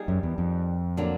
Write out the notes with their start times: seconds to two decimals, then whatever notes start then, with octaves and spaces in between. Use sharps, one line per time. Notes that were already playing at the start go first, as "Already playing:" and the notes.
Already playing: G3 A#3 D#4 G#4
0.08 F#2
0.23 E2
0.38 F2
0.97 D3 F#3 A#3 D4